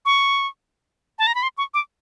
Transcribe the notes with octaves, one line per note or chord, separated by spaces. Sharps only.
C#6
A5
A#5
B5
C6
C#6
D6